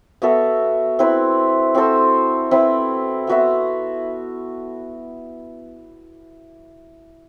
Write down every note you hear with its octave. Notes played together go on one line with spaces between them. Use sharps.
B3 F#4 A4 E5
C4 E4 B4
C4 F#4 A4 C5
C4 E4 B4
B3 F#4 B4 E5